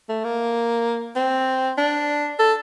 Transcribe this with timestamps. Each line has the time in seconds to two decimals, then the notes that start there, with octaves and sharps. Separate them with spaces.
0.09 A3
0.24 A#3
1.16 C4
1.78 D4
2.39 A4